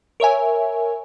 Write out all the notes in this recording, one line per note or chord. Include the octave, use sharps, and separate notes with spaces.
A#4 C#5 E5 G#5